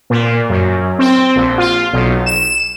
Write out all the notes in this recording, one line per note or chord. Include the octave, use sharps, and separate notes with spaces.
A#2
F#2
C4
A#1
F4
B1
E7